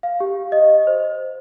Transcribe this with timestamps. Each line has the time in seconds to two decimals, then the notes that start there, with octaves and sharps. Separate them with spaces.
0.03 F5
0.20 G4
0.52 D#5
0.87 C5